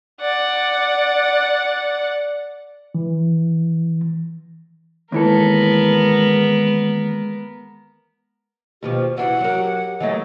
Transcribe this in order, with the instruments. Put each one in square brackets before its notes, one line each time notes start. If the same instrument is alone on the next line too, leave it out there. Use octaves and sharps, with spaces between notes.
[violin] D5 F#5
[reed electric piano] E3
[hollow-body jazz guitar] D#2 E3 A4 [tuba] G#3 [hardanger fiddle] B3 A#4
[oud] D#2 B2 F3 [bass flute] G4
[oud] E3 D4 [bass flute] F#4 [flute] F#5
[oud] F#3 A#4
[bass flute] G4
[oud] E3 F#3 A3 [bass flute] A#3 [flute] D#5